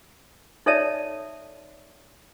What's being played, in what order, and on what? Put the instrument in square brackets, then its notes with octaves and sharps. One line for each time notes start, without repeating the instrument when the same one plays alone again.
[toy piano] D#4 A4 C#5 D5 E5 A5